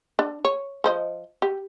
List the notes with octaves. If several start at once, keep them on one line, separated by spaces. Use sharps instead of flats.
D4
C#5
F3 C5 D#5
G4